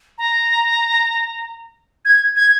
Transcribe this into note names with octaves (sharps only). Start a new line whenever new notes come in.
A#5
G#6
G#6